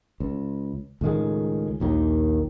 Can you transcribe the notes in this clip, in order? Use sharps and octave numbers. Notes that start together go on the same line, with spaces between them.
C#2
C#2 A2 D#3 G#3
A#1 D#2 D#3